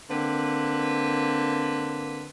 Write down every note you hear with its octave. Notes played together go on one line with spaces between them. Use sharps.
D3 A#3 C4 B4